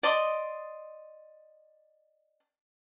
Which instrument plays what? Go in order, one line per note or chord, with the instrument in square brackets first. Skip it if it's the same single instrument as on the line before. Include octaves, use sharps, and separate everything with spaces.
[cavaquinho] D5 D#5 C6 D#6